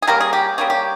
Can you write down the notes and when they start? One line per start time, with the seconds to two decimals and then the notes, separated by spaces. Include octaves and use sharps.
0.02 G#4
0.08 G3 A#3 C#4 A#4
0.20 G#4
0.33 G4
0.58 G3 A#3 C#4 G#4
0.70 G4